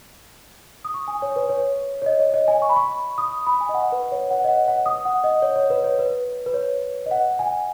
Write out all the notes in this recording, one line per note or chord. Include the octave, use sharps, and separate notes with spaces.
D#6
C#6
G#5
C#5
B4
C#5
C#5
D#5
C#5
D#5
G#5
C#6
B5
C#6
D#6
B5
G#5
D#5
F#5
B4
C#5
F#5
D#5
F#5
F#5
D#6
F#5
D#5
C#5
C#5
B4
C#5
B4
B4
C#5
D#5
F#5
G#5